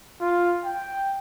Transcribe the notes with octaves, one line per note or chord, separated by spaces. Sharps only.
F4
G5